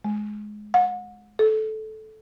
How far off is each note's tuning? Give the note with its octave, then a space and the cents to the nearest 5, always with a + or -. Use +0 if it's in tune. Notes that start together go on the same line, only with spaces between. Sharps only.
G#3 +15
F#5 -35
A4 -15